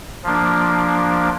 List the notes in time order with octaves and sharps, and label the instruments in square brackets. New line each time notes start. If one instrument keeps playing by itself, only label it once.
[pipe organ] F3 A#3 D4